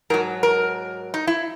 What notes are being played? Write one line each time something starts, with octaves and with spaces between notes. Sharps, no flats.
G#2 F#3 A#4
A#4
D#4
E4